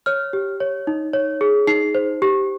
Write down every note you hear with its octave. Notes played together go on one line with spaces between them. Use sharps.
C#5 F6
G4
C#5
D#4
C#5
G#4
D#4 C7
C5
G4